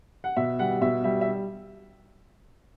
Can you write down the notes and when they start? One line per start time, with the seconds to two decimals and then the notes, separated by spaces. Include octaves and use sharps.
0.24 F#5
0.36 B2 E5
0.59 G3 F#5
0.81 B2 E5
1.04 G3 E5
1.21 E5